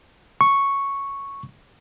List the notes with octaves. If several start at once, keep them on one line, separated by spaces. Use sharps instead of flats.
C#6